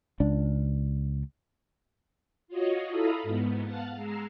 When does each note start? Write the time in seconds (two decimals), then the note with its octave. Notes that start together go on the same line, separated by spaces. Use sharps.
0.20 C#2 D4
2.48 F4 F#4 C#5 D#5
2.90 E4 A4 F5 A#5 B5 D#6
3.23 G#2 B3
3.64 F5 F#5 A5
3.96 G#3 A#5 E6 C7